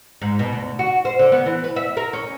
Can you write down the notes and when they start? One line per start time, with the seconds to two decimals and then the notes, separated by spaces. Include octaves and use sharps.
0.22 G#2
0.39 B2
0.53 D2
0.79 F#4
1.05 C5
1.19 D3
1.32 B3
1.46 E3
1.64 B4
1.76 E5
1.97 A#4
2.13 C#4